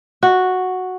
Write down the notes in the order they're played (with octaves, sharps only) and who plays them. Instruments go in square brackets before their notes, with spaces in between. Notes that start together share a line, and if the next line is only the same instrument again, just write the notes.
[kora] F#4